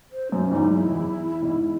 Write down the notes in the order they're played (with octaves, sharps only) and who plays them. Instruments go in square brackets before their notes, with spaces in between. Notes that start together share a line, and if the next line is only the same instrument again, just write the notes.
[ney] C5
[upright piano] F#2 [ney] C#4
[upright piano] E2 G#2 [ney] D#4
[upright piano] F#2 [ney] E4
[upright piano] E2
E2 G#2